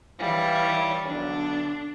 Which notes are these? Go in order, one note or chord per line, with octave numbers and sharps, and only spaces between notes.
E3 G3 E4 C#5 F5
B1 D3 D4